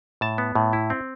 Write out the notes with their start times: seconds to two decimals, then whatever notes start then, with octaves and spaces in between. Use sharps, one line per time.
0.21 A2 A5
0.38 B3
0.55 A2
0.73 E4
0.90 C4